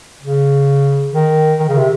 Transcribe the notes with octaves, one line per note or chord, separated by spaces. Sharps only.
C#3
D#3
D#3
C#3
C3